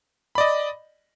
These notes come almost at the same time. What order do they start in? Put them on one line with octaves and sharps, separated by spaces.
B5 D5 D#5